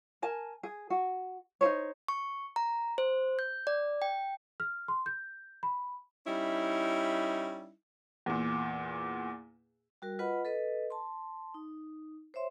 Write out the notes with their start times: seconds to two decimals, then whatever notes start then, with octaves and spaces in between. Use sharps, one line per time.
0.22 A#4 G#5 A5
0.63 G#4
0.90 F#4
1.61 D#4 F4 C5 C#5
2.08 C#6
2.56 A#5
2.98 C5
3.39 G6
3.67 D5
4.02 G5
4.60 F6
4.88 C6
5.06 G6
5.63 B5
6.27 G3 C#4 D#4 E4
8.26 E2 A#2
10.02 G3 F#4 A#4
10.19 F4 B4 D#5 F#5 B5
10.45 A4 B4 D#5
10.90 A5 C6
11.54 D#4
12.34 C5 C#5 E5 C6